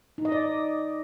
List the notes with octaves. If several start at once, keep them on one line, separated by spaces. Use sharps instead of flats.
D#4
D#5
D5